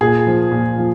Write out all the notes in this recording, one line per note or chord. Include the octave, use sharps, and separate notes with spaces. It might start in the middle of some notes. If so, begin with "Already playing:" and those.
A#2 G#4
F3
A#2
F3